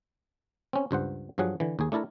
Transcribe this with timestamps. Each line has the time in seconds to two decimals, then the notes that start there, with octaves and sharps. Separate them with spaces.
0.73 C4 C#4
0.91 C#2 G2 C5 F#5
1.38 G2 F3 F#3 G#4 F#5
1.60 D3 E3
1.79 D#2 G#4
1.92 A3 D4 E4 A4 A#4